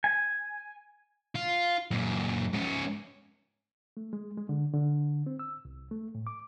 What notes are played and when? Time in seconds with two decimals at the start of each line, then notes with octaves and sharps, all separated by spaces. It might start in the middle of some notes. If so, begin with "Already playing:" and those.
0.04 G#5
1.35 F4
1.91 F#2 A#2
2.53 G#2 C#4
3.97 A3
4.13 G#3
4.37 G#3
4.49 D3
4.73 D3
5.27 C4
5.39 E6
5.65 C2
5.91 A3
6.15 A2
6.27 D6